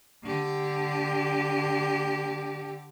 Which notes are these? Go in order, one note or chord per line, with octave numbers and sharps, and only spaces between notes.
D3 G4